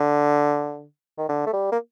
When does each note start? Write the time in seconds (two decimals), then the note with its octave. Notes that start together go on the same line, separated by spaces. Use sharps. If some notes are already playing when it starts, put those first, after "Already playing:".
Already playing: D3
1.18 D#3
1.29 D3
1.46 A3
1.53 G3
1.72 A#3